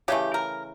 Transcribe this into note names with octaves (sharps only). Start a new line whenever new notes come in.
C#3 E3 A3 G4
A#4